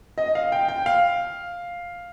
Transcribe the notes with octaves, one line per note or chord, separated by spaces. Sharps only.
D#5
F5
G5
G5
F5